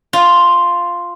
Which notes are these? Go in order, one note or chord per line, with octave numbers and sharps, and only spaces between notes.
F4